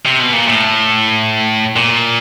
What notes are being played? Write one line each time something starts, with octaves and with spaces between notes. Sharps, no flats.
C3
B2
A#2
A2
A#2